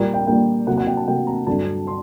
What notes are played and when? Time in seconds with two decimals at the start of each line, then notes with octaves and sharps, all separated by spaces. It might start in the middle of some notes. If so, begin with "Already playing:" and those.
Already playing: A#2 G3 A#3
0.14 G5
0.27 A#2 G3 A#3 G5
0.67 C3 F#3 A#3 F#5
0.77 F#5
0.87 G5
0.97 A5
1.07 C3 F#3 A#3 G5
1.27 A#5
1.47 G2 D3 F#3 A5
1.87 C6